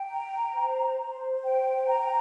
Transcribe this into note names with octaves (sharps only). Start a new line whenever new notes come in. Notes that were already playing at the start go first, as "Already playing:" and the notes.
Already playing: G5
A#5
C5
C5
G5
A#5